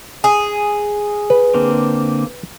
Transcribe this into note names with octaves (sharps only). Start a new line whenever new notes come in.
G#4
B4
D3 A#3 C4